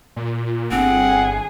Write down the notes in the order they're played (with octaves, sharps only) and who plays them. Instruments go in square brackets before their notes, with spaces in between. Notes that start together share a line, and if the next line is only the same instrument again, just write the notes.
[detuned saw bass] A#2
[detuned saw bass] G1 [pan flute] C4 [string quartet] G#4 [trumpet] F#5